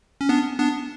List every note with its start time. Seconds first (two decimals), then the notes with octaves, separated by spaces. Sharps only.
0.21 C#4
0.29 B3 D4
0.58 B3 D4